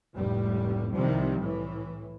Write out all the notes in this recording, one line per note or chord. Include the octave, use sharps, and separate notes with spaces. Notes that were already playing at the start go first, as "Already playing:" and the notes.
F1 C#2 A2 G3
C2 C3 D#3 F3 G3
A2 E3